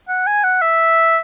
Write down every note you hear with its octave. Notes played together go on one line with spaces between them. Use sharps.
F#5
G#5
F#5
E5